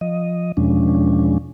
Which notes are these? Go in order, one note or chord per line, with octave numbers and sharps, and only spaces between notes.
F3 D#5
E2 B2 F3 G#3 C#4 D4